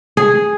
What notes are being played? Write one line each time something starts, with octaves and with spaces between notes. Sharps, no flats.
G#4